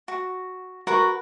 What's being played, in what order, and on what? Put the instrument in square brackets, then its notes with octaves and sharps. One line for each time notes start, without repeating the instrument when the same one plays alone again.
[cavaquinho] F#4
[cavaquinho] F#4 B4 C#6 [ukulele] A#4